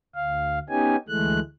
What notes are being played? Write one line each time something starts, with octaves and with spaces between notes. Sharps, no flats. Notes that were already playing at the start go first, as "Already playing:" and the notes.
D2 F5
B3 C#4 D#4 G4 G#5
D2 E3 G#3 A3 F#6